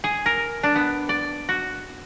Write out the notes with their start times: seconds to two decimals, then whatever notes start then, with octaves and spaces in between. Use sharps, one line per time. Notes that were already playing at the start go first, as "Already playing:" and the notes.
0.04 G#4
0.26 A#4
0.63 D4
0.75 B3
1.09 D5
1.49 F#4